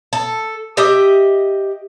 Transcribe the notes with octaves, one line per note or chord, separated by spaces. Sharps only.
A4
G4 D#5 E5